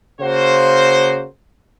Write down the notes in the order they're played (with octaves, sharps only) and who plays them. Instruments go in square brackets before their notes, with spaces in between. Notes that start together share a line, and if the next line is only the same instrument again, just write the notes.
[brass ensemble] C#3 A#3 F#4 C5